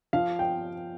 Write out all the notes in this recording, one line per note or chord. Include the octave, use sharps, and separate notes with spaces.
F3 F5
G5